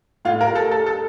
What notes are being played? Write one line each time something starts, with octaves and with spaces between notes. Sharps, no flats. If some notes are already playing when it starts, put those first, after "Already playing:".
A2 F4
A#4
A3 A4
A4
A4